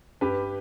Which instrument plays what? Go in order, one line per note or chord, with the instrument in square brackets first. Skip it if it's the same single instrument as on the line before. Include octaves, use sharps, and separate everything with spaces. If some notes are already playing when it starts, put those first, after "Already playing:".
[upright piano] G2 G4 B4